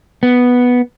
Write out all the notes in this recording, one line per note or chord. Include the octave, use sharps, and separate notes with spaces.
B3